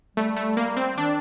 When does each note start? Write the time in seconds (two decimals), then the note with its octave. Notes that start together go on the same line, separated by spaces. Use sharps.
0.17 G3 A3
0.36 A3
0.57 A#3
0.77 C4
0.97 D#3 D4